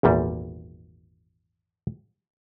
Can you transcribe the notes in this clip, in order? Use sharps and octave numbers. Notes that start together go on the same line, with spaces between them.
G#1 E2 A#2 G3